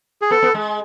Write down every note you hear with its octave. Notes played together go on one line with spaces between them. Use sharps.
G#4
B3 A4
B3
G#3